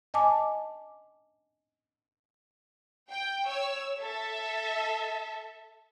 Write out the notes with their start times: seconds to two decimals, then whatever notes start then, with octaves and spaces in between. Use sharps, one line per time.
0.14 D#5 G#5 A5 D6
3.10 G5
3.46 C#5 E6
3.99 A4 E5